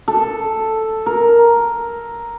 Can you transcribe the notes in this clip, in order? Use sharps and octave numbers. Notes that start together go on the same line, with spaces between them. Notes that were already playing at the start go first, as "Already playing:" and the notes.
A4
A#4